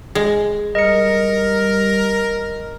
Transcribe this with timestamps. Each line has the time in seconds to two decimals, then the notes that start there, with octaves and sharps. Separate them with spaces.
0.15 G#3
0.75 G3 A#4 D#5 C#7